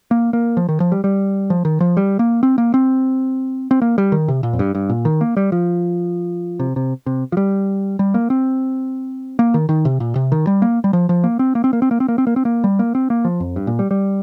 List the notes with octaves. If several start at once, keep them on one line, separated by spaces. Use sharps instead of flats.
A#3
A#3
F3
D#3
F3
G3
G3
F3
D#3
F3
G3
A#3
C4
A#3
C4
C4
A#3
G3
D#3
C3
A#2
F2
G2
G2
A#2
D#3
A#3
G3
F3
C3
C3
C3
F3
G3
G3
A#3
C4
A#3
D#3
D#3
C3
A#2
C3
D#3
G3
A#3
G3
F3
F3
A#3
C4
A#3
C4
A#3
C4
A#3
C4
A#3
C4
A#3
C4
A#3
G3
A#3
C4
A#3
F3
F2
G2
A#2
G3
G3